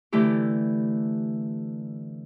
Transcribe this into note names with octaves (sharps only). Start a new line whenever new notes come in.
D3 E3 A3 E4 G4